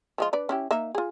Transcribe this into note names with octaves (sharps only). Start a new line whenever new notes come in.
F3 G#3 F4
D4 B4 D5
C#4 E4 G4
A#3 D#4 E5
F4 G#4